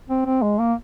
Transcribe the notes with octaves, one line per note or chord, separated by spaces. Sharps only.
C4
C4
G#3
A#3